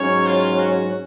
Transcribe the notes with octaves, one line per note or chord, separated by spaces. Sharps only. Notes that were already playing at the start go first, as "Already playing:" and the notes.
Already playing: G#2 F#3 C#4 C#5
F4
F#4